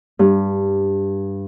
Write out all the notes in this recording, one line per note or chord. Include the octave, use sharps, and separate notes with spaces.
G2